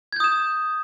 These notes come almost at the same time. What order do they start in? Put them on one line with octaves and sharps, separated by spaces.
G#6 G6 D#6 E7